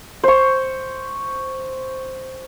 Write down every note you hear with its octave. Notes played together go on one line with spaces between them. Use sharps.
C5 C#6